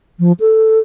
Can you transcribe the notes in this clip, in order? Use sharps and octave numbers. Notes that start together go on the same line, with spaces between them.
F3
A4